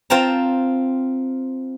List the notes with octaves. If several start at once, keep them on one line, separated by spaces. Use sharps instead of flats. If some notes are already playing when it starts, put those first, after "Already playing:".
C4 F4 G5 A5 A#5